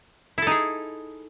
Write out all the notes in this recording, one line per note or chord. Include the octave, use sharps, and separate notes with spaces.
D#4 E4 G#4 A4